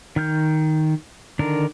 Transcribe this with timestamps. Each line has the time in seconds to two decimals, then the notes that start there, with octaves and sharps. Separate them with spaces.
0.16 D#3 F6 G6
1.39 D3 D#3 D4 A#4